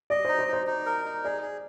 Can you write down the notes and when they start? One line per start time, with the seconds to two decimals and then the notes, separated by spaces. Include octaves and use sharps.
0.10 D5 D#5
0.25 D#4 C5
0.39 C5
0.48 D#4
0.53 C5
0.67 D#4
0.86 A#4
1.05 D#4
1.24 G#4 D5
1.42 G#4